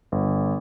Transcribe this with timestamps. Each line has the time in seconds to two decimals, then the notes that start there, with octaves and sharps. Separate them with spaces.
0.12 G1